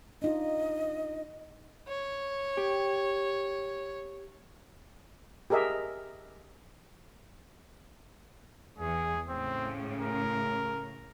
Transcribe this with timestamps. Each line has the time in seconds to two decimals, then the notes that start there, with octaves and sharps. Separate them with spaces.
0.22 D4 D#4 F4 D#5
1.88 C#5
2.57 G4
5.50 G4 G#4 A#4 D#5 E5
8.79 E2 G#4
9.29 A2 C#3 C4
10.01 A#4